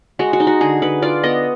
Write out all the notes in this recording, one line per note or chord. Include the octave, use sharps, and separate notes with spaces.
G#3 F#4
F#4
D#4
F#4
D3 G#4
D3 B4
F4 D5
B3 D#5